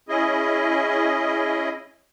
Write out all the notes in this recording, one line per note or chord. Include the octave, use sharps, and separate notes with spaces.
C#4 E4 G#4 D#5